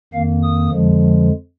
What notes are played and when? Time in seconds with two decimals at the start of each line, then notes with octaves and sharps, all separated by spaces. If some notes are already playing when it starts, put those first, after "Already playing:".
0.13 F2 D#3 A#3 F5
0.43 D#6
0.72 F2 D3 F3 G#3